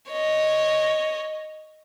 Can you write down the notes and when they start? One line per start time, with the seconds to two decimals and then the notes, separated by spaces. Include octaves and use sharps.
0.11 C#5 D#5